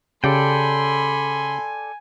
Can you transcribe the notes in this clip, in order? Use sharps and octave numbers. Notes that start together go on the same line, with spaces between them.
C#3 G4 A4 D5 G5 G#5 B5 C6